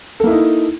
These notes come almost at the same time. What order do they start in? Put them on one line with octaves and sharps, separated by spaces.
A4 A#3 E4 D#4